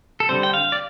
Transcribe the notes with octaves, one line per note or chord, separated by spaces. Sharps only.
A4
D3 G3 C4 C5
G5
F5
D5